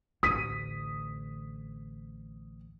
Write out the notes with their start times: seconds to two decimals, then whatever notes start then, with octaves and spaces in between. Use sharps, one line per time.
0.23 A1 D2 D#6 B6 D#7